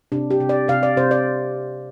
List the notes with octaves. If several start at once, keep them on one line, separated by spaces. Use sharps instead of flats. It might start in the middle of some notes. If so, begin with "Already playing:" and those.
C3 D4
G4
C3
D5
C3 F5
D5
C3 C5
D5